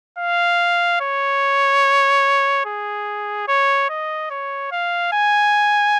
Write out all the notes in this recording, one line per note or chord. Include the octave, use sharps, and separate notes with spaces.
F5
C#5
G#4
C#5
D#5
C#5
F5
G#5